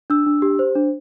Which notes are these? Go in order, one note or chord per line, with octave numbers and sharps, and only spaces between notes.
D4 E6
D4
G4
C5
D4